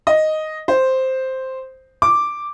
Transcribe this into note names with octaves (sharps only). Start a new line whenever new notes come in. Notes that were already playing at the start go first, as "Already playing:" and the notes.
D#5
C5
D6